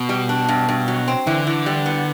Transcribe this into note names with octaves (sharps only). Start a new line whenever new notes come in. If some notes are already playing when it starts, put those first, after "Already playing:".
Already playing: B2
G3
D4
G2
G2
F#3
C4
D3 E3
E3
G3
B3